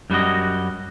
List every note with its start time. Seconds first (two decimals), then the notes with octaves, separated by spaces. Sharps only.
0.10 F#2 G3 B3 F#4 D#5